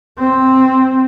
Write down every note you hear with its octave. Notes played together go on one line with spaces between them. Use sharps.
C4